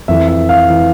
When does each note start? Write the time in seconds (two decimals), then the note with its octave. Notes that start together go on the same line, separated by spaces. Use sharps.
0.08 F2 E3 E5
0.28 E5
0.49 F5
0.70 E3